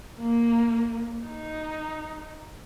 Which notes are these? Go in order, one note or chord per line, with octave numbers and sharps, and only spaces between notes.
A#3
D#4